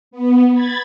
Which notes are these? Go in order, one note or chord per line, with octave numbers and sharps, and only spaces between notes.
B3
B5 G#6 A6